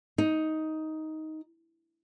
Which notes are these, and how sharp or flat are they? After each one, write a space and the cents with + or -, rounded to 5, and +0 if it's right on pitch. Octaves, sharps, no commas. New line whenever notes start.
D#4 +10